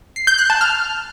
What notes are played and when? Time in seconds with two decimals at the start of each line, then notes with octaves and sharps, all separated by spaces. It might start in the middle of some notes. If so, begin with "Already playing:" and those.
0.16 C7
0.27 G6
0.38 F#6
0.50 A5
0.61 F6